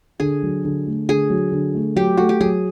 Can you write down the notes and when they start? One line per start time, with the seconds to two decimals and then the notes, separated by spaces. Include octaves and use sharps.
0.20 D3 G#4
0.43 F#3
0.65 D3
0.87 A3
1.09 D3 G#4
1.30 F#3
1.52 D3
1.74 A3
1.96 F#3 G4
2.17 A3 F#4
2.29 G4
2.40 F#3 G#4